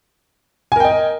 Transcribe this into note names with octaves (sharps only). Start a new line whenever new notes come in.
A#4 D#5 G5 G#5